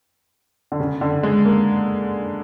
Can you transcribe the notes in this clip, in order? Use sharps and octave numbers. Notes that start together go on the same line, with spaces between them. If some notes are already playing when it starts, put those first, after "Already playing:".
D3
C#3
D3
G#3
A#3